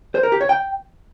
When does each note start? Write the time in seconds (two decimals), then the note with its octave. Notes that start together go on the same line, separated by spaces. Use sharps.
0.15 C5
0.23 A#4
0.32 G4
0.41 C#5
0.49 G5